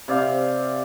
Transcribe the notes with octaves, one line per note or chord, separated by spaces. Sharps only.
C3 D5 F5